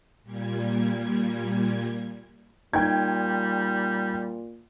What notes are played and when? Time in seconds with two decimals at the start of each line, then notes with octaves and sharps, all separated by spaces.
0.23 A#2 G3 G#6
2.73 A#2 G3 D#4 G5 G#6